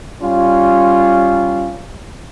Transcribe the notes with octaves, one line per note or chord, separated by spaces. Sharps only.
G3 C#4 F4